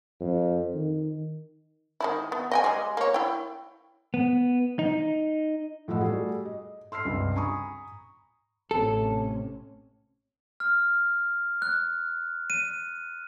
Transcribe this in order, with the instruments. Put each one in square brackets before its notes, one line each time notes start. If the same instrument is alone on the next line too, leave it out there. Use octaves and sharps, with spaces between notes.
[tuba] F2
D#3
[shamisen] D#3 G#3 E4
B3
D#5 G5 G#5
G3 G#3
A#3 C#5
E4 G5
[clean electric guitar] B3
D#4
[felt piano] A2 F3 D#5 F#5 E6
G3 A3 F#4 G#4
D#5
C6 E6 F6 C7
C#2 G2 C3
G#5 A#5 B5 C#6 D#6
[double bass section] A1 C3 C#4 [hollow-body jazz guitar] A4
[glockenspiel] F6
F#6
D#7